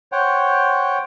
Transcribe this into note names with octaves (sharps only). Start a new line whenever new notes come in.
C5 C#5 F#5 G5